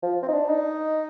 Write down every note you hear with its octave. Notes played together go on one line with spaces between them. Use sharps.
F3
C4
D#4
D4
D#4